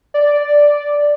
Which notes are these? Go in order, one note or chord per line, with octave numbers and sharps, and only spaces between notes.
D5